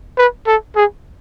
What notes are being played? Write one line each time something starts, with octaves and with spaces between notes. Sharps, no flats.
B4
A4
G#4